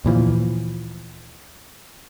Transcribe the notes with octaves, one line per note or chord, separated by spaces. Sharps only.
D2 A#2 E3 F3